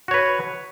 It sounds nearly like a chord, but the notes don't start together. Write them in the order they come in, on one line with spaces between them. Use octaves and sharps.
F#4 C#5 B4